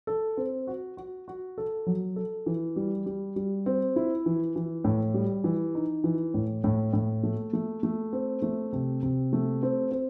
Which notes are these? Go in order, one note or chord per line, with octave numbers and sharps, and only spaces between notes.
A4
C4
F#4
F#4
F#4
A4
F#3
A4
E3
G3
G3
G3
C4
E4
E3
E3
A2
G3
E3
D#4
E3
A2
A2
A2
A3
A3
A3
C4
A3
C3
C3
A3
C4
C4